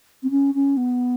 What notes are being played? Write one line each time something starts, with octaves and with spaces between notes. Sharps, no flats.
C4
C#4
C#4
B3